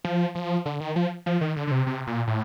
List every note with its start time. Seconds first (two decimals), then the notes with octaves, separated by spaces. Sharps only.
0.04 F3
0.35 F3
0.66 D3
0.80 D#3
0.96 F3
1.26 F3
1.41 D#3
1.56 D3
1.67 D3
1.71 C3
1.86 C3
2.07 A#2
2.27 A2